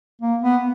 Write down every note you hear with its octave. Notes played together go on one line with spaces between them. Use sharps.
A#3
B3